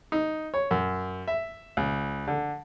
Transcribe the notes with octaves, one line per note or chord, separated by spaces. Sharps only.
D#4
C#5
F#2
E5
C#2
D3